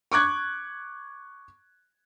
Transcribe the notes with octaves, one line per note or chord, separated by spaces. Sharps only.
C#6 D6 F#6 G#6